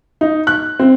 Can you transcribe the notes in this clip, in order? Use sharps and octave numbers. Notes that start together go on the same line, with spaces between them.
D#4
F#6
C4